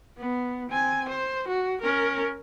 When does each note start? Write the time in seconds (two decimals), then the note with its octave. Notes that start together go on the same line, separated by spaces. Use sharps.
0.17 B3
0.70 C4 G#5
1.09 C5
1.48 F#4
1.81 C#4 A#4